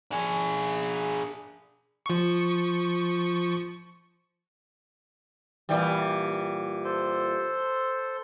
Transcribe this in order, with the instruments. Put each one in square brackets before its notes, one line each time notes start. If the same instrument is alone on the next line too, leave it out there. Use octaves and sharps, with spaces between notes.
[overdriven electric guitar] D4 G#4
[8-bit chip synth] F3 C#6
[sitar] A#2 E3 G3
[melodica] A4 C5